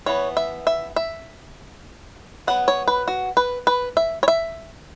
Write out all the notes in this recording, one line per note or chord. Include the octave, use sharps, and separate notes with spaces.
E3 B3 C#5
E5
E5
E5
F#3 B3 F#5
C#5
B4
F#4
B4
B4
E5
C#5
E5